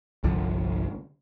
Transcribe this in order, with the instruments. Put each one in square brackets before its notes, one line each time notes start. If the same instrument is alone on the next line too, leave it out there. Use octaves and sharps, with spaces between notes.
[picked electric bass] G1 C2 D3 F3